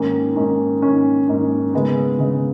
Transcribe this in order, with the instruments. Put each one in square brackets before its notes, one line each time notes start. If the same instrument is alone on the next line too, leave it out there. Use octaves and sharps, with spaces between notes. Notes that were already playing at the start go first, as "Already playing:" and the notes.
Already playing: [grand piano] G#2 D#3 A#3 C#4
G#2 D#3 A#3 C#4
G#2 D#3 A#3 C#4
G#2 D#3 A#3 C#4
C#3 G#3 B3
C#3 G#3 B3